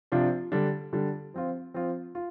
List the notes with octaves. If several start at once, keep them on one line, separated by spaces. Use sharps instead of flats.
C3 F3 D4 F4
D3 G3 D4
D3 G3 D4
F3 C4 F4
F3 C4 F4
F4